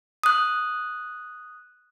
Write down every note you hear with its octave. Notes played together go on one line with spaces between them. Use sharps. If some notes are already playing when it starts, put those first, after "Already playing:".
D#6 F#6